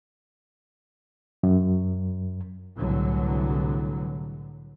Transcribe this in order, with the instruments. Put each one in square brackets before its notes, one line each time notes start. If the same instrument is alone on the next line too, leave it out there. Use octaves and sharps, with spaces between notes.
[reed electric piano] F#2
[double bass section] C2 A2 D3 E3 F#3